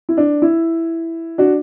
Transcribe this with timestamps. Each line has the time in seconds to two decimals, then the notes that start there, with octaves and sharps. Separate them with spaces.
0.09 E4
0.17 D4
0.42 E4
1.38 D4 F#4